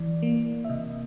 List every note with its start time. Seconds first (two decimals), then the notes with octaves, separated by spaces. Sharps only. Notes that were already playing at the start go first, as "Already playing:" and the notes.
Already playing: E3 D5
0.22 A#3
0.65 E5
0.69 C3 D#5